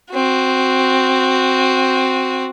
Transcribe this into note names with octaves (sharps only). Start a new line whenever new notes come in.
C4 F#4